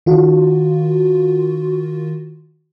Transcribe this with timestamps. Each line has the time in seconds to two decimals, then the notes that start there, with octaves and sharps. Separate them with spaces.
0.06 D#3 F4 F#4